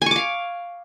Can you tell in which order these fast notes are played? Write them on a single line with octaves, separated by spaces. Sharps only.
G#5 C#6 D6 F5